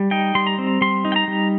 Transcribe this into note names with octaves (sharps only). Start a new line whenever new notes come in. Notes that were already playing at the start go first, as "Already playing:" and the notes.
Already playing: G3
D#4 G5
G3 C6
A#5
C4
G3 C6
D#4
G5
A#5
G3